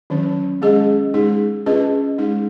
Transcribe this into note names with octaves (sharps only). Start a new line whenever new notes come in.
D#3 F#3 C#4
G#3 C#4 G#4 D#5
G#3 D#4 G#4
C#4 F4 G#4 B4 D#5
G#3 D#4 G#4